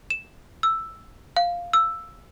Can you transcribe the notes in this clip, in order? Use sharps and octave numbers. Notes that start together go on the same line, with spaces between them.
E7
E6
F5
E6